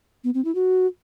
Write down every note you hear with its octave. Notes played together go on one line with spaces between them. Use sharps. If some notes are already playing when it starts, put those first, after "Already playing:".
B3
C4
E4
F#4